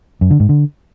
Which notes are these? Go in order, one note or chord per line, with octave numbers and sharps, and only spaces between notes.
F#2
D3
G#2
D3